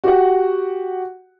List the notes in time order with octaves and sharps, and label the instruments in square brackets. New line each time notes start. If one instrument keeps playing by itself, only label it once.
[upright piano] F#4 G4 F#5